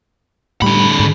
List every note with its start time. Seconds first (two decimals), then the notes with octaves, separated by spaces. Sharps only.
0.62 A2 D3 G3 B5
1.00 G#2